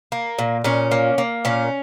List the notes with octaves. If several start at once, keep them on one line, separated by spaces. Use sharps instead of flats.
A#3
A#2
A#2 C#4
A#3
A#3
A#2 C#4